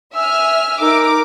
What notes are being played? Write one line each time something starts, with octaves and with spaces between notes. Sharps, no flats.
E5 G#5 E6 F6
D#4 A#4 D6 E6